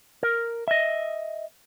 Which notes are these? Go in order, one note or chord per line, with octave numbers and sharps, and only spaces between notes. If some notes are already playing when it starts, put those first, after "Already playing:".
A#4
D#5 E5